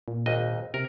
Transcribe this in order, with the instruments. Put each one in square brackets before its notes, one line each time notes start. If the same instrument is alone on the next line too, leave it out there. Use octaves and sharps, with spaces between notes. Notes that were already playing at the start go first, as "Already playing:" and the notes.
[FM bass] A#2
[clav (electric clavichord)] G#1 D#2 D#5
[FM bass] C3 [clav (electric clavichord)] A#4